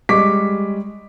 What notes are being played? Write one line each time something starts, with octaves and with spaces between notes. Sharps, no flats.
G3 G#3 C#6 D6 B6